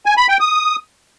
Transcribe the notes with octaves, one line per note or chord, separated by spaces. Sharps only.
G#5
B5
G5
D#6